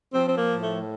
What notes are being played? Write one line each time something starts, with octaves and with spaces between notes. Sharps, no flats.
F3 C4
C4
A#3
A2
A3